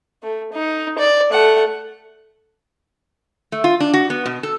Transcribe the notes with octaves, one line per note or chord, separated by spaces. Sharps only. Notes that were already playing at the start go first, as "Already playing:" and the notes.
A3
D#4
D5
A3 F#5
A3
F4
D4
F#4
B3
B2
A4